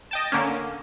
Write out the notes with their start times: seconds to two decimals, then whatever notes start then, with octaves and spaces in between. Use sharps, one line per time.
0.11 D#5 G5 A5
0.32 D3 A#3 C#4